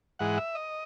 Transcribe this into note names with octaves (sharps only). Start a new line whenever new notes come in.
G#2 E3 G#3 F#5
E5
D#5